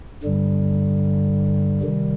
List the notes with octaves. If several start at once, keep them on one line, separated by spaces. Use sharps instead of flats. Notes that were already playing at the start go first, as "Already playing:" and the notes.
G2 D3 G3
C3 D#3 G3